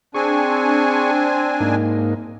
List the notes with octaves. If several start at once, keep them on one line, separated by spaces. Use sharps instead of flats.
C4 D4 G#4 G#5 C#6
G#2 A#3 D#4